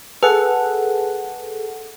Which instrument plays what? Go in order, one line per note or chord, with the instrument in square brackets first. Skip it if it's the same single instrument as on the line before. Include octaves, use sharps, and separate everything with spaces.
[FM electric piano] G#4 A4 F#5 [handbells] B4